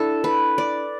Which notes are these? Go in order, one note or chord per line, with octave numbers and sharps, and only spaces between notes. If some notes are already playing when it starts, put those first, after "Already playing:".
Already playing: D4 E4 A4
B4
D5